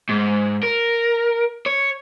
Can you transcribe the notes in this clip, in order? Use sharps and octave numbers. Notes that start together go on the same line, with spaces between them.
G#2
A#4
C#5